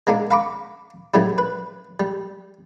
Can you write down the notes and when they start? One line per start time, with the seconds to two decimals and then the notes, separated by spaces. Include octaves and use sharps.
0.07 G#3 A#3 D4 D#4
0.31 F5 A#5 B5 C#6 D6
1.14 F#2 A2 C#3 G3 E4
1.38 B4
2.00 G3